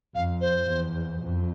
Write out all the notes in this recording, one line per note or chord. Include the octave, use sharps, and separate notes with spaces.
F2 F5
C5
E2
F2